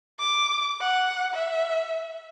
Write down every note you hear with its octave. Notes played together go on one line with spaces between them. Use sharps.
D6
F#5
E5